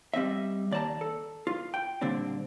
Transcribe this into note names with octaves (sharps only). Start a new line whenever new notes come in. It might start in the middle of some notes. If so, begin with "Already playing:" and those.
G3 C4 D#5 E5
D#2 D5 F5 A5 A#5
A4
F4
G5
A#2 D3 G3 C4 D4